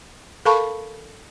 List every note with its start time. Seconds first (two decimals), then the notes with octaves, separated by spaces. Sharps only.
0.45 A4 A#4 F5 A5 B5 C#6